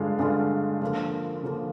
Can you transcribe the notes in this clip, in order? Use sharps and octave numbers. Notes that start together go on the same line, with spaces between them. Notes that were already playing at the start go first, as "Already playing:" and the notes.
Already playing: G2 D3 G#3 D4 F4
G2 D3 G#3 D4 F4
D3 F3 A#3
D3 F3 A#3